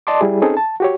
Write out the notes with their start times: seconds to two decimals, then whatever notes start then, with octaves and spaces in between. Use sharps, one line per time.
0.07 D5 D#5 A5 C6 D6
0.21 G3 E4 G#4
0.42 C4 C#4 D#4 G#4 A4
0.57 A5
0.80 F#4 G4 C#5